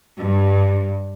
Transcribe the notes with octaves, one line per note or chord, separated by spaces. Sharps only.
G2